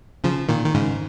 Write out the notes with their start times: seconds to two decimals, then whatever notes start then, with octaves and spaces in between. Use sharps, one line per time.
0.24 C#3 F3
0.49 A#2 D#3
0.66 D#3
0.74 G#2 C#3